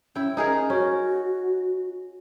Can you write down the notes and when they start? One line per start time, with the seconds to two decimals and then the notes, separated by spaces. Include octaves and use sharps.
0.15 C#4 E4 G5
0.37 D#4 G#4 A#4
0.70 C#4 F#4